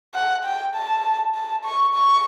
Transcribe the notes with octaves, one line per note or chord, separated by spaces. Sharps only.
F#5
G5
A5
A5
C#6
C#6